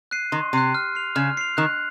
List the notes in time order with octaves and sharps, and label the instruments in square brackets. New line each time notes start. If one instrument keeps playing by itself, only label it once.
[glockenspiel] F#6 C7 D#7
[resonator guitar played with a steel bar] D#3 [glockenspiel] C6
[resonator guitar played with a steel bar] C3 [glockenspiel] F#6 C7 D#7
[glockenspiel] F6
C7 F7
[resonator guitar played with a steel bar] C#3 [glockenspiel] F6
[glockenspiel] C7 F7
[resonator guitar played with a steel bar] D#3 [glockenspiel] F#6